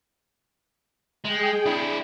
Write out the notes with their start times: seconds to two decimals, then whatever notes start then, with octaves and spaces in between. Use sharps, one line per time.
1.25 G#3 G#4 G5
1.66 D4 E4